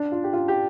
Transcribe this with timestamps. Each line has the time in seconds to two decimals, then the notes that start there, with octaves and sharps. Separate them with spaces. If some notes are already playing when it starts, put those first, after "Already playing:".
Already playing: D4
0.12 F4
0.24 G4
0.33 F4
0.48 G4